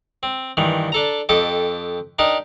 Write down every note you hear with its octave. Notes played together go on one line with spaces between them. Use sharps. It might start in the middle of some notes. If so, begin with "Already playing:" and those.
C4
G2 D#3 E3
D4 A4 A#5
F2 G4 A4 D#5 D6
D4 D#4 G4 A#4 D#5